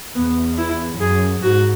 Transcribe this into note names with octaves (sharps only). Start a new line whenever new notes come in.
E2 B3
E4
F#2 G#4
G#2 F#4